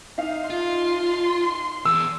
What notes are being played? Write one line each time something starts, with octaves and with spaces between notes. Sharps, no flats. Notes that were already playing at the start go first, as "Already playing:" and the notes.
D#4 E5 F5
F4 C6
E2 E6